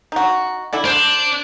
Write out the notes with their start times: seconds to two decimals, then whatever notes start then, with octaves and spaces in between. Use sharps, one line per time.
0.12 D#4 F#4
0.73 D3 D4 E4
0.85 D4 C5